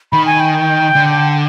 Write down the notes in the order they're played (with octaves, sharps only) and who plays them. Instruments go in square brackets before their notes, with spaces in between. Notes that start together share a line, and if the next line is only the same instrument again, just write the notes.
[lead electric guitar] D#3 [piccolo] B5
[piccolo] G#5
G5
[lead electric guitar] D3